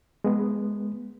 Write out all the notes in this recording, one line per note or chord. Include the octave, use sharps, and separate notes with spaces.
G#3 B3